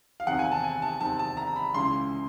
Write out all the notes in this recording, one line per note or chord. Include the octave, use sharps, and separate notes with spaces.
F5
E2 C3 D#3 F#5
G#5
A5
G#5
A5
E2 C3 D#3 A5
A5
A#5
B5
C#2 C#3 E3 C6